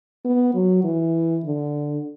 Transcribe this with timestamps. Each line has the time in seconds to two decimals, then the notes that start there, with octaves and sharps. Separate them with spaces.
0.25 B3
0.54 F#3
0.84 E3
1.44 D3